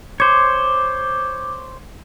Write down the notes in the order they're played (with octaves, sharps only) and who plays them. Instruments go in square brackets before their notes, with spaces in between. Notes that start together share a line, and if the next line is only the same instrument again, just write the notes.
[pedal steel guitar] C5 C#5 [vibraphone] D6